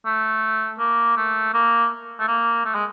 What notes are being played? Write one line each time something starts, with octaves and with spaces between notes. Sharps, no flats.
A3
A#3
A3
A#3
A3
A#3
A3
G#3